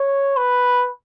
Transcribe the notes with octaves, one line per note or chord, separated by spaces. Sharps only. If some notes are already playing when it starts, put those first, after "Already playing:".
Already playing: C#5
B4